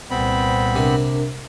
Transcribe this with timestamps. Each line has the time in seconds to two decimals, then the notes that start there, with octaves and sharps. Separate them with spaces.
0.10 C2 A#2 B3 C4 B5
0.76 C3 D4 A#4